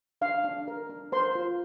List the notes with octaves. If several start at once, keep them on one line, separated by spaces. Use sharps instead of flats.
D4 F5
D4
A#4
D4
A#4 C5 C6
F4